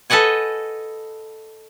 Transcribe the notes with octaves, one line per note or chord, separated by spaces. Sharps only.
A4 B4 D#5 F#5 G#5